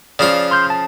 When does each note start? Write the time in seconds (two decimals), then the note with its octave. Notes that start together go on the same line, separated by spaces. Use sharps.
0.19 C#3 F3 F4 D5
0.51 C6 F6 G6
0.70 A5